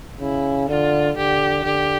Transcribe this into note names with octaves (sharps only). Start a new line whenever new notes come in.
C#3 E4
D3 F4
D3 G4
D3 G4